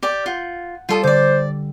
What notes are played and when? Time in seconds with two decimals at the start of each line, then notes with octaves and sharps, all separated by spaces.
0.03 G4 D5
0.26 F4 F#5 G6
0.89 G3 F4 A4 D#6
1.03 D3 C5 D5 D6